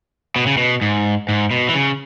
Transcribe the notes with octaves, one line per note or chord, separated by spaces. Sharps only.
B2
C#3
B2
G#2
G#2
B2
E3
C#3